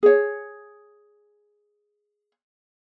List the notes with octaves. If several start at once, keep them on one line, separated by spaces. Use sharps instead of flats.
G#4 C#5